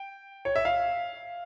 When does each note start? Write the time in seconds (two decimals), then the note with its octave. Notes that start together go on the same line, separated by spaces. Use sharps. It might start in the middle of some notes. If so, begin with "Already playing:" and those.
Already playing: G5
0.45 C#5
0.56 E5
0.65 F5